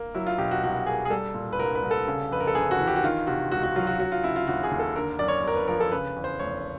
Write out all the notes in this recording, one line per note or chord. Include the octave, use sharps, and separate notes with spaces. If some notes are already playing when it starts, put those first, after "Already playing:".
Already playing: A#3
F#3 E4
F4
B2 G4
F#4
C2 F#4
A#3 G#4
G#4
G3 A4
A#2
B4
C2 A#4
B4
C2
A4
C#3
F2 B4
A#4
A4
G1 G#4
F#4
E3
G4
F#4
D#3 F4
C3 F#4
C#2 F#4
F#4
F#3 F4
F#4
F#3 F#4
F4
C#3 E4
F4
D#2 F#4
G#4
D#2
A4
D3 A#4
F#2 D5
C#5
G1 A#4
B4
F3 A#4
A4
C#3 B4
E2
C5
F1 C#5